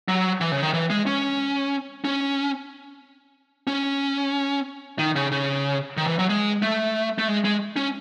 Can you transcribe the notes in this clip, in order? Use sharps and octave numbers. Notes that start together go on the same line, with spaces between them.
F#3
E3
C#3
D#3
E3
G#3
C#4
C#4
C#4
D#3
C#3
C#3
D#3
E3
F#3
G#3
A3
A3
G#3
G#3
C#4